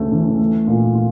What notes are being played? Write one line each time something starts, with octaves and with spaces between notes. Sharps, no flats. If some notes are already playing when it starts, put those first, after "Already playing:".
Already playing: D2 C#3 A3
E3
A3
A#2
F4